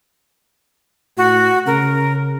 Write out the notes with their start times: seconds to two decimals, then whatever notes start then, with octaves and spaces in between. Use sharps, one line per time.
1.17 A2 F#4
1.67 C#3 A#4